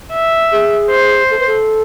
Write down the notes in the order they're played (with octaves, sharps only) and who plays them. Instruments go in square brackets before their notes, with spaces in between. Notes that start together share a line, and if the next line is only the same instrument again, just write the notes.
[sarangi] E5
[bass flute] G#4
[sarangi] C5
[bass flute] A4
B4
A4